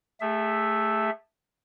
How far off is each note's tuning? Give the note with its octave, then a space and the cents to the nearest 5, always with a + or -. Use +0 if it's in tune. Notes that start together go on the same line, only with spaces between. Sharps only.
A3 +0 G#4 -35 E5 +0